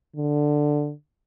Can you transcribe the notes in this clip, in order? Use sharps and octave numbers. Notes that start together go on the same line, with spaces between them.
D3